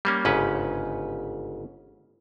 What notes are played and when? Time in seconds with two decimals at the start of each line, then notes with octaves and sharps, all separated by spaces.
0.05 G3 A#3 C#4
0.25 G1 G#2 C#3 C#4 B4